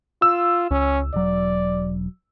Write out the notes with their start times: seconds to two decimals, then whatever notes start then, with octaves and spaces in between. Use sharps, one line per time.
0.22 F4 E6
0.71 C#2 C#4
1.14 E1 F#3 D5